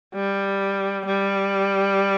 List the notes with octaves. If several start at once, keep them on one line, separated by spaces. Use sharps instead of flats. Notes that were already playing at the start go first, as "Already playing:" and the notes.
G3
G3